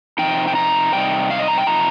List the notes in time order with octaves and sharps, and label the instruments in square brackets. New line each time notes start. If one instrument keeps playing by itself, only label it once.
[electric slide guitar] C3 F3 D#4 G5
G5
A#5
C3 G3 D#4 G5
F5
D#5
A#5
G5
C3 F3 D#4 A#5